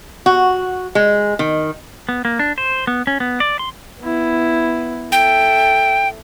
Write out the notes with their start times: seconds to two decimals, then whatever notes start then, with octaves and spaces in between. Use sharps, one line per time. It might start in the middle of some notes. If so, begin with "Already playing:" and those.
0.26 F#4
0.95 G#3
1.39 D#3
2.09 B3
2.25 A#3
2.39 D4
2.58 C5
2.87 B3
3.07 C#4
3.20 B3
3.40 D5
3.59 C6
4.00 B3 E4
5.12 A4 E5 G5